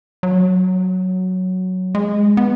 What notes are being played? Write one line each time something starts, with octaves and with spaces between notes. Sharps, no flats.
F#3
G#3
B3